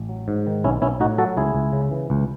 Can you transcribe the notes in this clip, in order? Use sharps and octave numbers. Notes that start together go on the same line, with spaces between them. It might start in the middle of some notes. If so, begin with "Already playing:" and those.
Already playing: A1
F#3
G#2
D#3
B1 C#4 E4
B1 C#4 E4
A2 D#4 F#4
F#3 F#4 A4
C#2 E4 G#4
C#2
C#3
E3
C#2